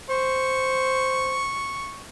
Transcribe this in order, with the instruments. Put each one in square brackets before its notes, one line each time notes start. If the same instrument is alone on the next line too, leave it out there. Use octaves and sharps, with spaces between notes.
[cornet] C5 [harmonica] C#6